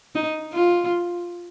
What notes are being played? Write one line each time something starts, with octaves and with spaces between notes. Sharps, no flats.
D#4
F4